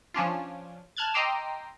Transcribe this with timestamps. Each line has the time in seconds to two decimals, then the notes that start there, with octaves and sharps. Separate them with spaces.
0.14 F3 C#4 D4 F4
0.97 A5 F6 F#6 G#6 A6
1.14 D#5 G5 A#5 C6 D6 E6